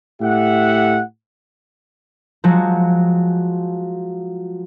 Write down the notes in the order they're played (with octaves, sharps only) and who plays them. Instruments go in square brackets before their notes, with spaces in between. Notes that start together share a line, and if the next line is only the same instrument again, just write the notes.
[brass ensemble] A2 G4 E5 F#5
[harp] F3 F#3 G#3 F#4